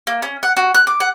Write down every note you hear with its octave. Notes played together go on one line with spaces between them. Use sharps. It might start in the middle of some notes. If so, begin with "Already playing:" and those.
A#3
C#4
F#5
F#4
F#6
D6
F#5